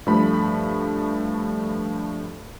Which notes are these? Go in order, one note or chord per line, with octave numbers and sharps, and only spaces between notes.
G2 F3 A3 B5